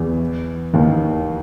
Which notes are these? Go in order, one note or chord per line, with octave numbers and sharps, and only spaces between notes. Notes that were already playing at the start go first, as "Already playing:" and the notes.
Already playing: E2 E3
D#2 D#3